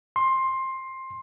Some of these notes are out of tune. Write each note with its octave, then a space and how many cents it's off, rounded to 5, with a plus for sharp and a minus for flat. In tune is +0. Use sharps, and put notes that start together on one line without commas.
C6 +15